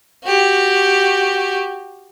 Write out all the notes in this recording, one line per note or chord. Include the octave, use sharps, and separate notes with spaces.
F#4 G4